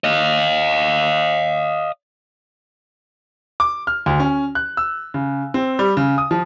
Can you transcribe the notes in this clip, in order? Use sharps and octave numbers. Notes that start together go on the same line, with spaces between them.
D#5 F5
D6
F6
D2
C#4
F#6
E6
C#3
C4
G3
C#3
D#6
F3